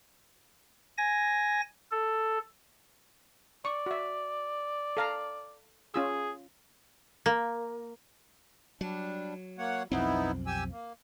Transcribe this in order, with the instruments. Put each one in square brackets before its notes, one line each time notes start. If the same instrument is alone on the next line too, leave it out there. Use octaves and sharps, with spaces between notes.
[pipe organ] G#5 A#6
A4
[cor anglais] D5 [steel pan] C#6
[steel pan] F#4 E5
A4 F5 A#5
[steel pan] C#4 F4 E6 [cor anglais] G#4
[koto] A#3
[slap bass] F#3 [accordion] G3 D4
[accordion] A#3 C#5 F#5
[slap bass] B1 F2 C4 [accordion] B3 D#4 E4
[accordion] G4 G#5 E6
A#3